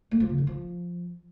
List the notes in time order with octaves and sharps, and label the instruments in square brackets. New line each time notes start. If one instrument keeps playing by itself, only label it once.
[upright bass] A3
F3
C#3
D#3
F3